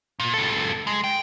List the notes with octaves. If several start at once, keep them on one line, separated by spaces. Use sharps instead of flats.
A#2
C#2 A4
G#3
G5